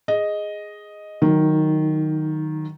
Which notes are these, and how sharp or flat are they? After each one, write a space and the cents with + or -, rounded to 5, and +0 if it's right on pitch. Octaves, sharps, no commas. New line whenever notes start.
G#4 +0 D#5 +0
D#3 -5 F#3 +0 D#4 +35